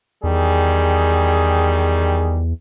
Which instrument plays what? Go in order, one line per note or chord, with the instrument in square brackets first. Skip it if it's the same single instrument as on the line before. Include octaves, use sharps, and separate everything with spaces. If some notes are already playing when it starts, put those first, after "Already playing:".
[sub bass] E2 [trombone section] D#3 G3 G#4